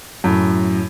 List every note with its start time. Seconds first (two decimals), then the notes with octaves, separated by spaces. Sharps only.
0.24 F#2 A2